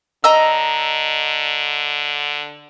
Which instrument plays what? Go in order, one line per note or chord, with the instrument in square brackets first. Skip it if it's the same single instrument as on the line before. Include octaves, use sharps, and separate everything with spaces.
[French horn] D3 [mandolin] D#5 A#5 E6